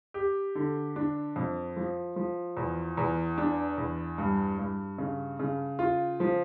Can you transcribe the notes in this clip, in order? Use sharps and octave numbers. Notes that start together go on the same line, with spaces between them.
G4
D3
D4
F2
F3
F3
E2
E2
D4
E2
G2
G2
C#3
C#3
F4
F3